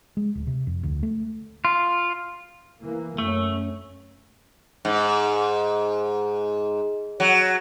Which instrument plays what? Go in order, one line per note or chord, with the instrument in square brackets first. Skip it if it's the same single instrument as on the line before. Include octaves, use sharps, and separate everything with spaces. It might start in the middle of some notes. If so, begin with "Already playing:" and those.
[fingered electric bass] G#3
D1
C3
F2
D2
A3
[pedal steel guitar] F4
[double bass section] E3 A#3
[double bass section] F#2 C#4 [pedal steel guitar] A3
[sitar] G#2
F#3